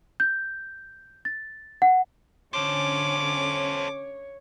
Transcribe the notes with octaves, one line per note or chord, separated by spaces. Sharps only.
G6
A6
F#5
D3 C#4 A4 C5 C#5 D6